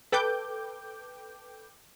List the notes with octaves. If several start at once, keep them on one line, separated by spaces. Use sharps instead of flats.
A4 B4 G5 D6 G6